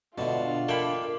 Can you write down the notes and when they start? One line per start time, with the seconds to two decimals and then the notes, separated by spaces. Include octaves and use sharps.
0.18 B2 D3 D4 F4 E5
0.69 A#3 A4 G5 B5